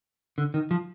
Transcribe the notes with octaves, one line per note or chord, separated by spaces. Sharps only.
D3
D#3
F3